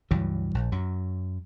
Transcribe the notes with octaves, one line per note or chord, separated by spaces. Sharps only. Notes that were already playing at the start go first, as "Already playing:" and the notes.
C#2 G2 E3 F#3
A#1
F#2 F#3